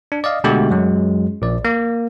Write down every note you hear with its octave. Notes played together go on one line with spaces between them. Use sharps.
D4
D5 D#5 F5
B2 D3 G#3 A3 F#4 G4
F#2 F#3 G#3
A#1 D5
A#3